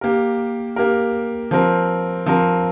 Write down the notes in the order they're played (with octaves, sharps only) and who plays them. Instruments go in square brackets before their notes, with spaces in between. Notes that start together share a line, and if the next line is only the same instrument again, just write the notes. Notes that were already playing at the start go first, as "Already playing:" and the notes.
[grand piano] A#3 G4 A#4
A#3 G4 A#4
F3 C4 A#4
F3 C4 A#4